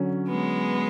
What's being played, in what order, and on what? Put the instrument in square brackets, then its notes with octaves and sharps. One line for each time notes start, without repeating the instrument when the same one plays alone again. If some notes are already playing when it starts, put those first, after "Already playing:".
Already playing: [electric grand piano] D3 F#3 C#4
[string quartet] G#3 B3